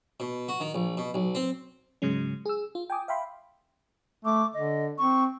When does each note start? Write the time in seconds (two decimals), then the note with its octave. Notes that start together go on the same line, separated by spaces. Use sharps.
0.20 B2
0.48 F#4
0.60 D#3
0.74 A#1
0.97 B2
1.14 B1
1.35 C4
2.02 G#2 C#3 F#3 G#3 C#4
2.45 G#4 E6
2.75 F4
2.90 G5 G#5 D6 D#6
3.08 E5 F5 G5 B5 C6
4.25 A3 D6
4.54 D3 D#5
4.98 C4 C#6